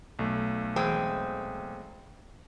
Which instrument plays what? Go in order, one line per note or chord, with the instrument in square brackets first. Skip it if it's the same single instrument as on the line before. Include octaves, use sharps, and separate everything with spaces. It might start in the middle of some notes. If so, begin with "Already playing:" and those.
[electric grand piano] B1 A3
[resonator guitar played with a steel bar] E2 G#3 C4